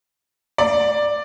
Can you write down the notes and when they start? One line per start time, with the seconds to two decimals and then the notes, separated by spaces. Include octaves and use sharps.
0.58 D5